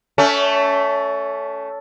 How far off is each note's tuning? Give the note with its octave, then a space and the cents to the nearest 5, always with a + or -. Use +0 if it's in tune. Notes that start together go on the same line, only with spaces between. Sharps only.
A3 +0 C#4 +25